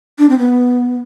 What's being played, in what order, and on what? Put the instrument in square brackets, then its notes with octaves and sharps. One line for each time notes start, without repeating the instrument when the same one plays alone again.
[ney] D4
C4
B3